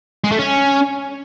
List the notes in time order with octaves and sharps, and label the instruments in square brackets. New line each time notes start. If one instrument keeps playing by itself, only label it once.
[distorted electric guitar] G#3
A3
C#4